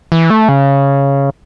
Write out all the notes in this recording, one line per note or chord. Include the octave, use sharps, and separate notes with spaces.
E3
A3
C#3